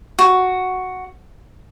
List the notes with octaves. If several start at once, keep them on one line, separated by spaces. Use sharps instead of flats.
F#4